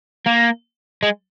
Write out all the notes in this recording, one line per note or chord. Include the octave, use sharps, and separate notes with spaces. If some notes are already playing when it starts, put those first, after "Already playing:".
A#3
G#3